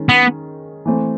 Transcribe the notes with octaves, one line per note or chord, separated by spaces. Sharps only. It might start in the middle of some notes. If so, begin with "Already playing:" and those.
Already playing: D#3 G#3 C#4
B3
E3 A3 C4